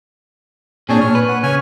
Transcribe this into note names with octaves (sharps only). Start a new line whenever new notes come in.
A#2 C4 D4 G#4 C#5 G#5
A#2 C#5 F6
B4
F#5
C#3 C#5 G#5 F6